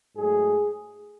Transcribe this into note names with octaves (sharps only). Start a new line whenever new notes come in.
G#2 F#3 A3 G#4